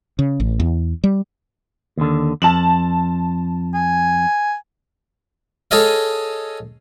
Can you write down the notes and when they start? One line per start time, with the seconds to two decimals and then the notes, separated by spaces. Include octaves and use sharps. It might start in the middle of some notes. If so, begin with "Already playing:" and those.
0.19 C#3
0.40 A1
0.60 E2
1.04 G3
1.97 D#2 D3
2.42 F2 A5 E7 F#7
3.74 G#5
5.71 G#4 A4 C#5 D#5 F5